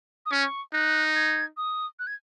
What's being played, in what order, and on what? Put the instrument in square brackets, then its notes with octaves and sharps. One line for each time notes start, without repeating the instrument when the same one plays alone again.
[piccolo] D#6
[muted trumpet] C#4 [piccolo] C#6
[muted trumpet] D#4 [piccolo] F#6
[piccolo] G#6
D#6
F#6
G#6